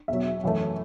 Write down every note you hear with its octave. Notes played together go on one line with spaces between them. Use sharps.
E2 B2 F#3 E5
F#2 E3 A3